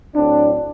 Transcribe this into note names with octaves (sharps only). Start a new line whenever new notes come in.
A2 F#3 C4 D4